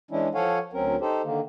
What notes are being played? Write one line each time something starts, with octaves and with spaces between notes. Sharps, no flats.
E3 G#3 C#4 D4 E4
F3 A4 C#5 F5 F#5 G#5
D2 F#3 C4 C#4 A#4
D#4 G4 A4 C5
D3 D#3 A#3